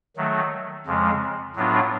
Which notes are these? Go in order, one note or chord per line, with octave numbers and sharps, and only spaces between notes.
D#3 F#3 A3
F2 C#3 F3 G#3
A2 F#3 B3 D4 F4